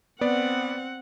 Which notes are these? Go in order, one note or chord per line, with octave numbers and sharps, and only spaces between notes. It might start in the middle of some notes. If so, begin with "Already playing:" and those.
B3 C4 D5 F#5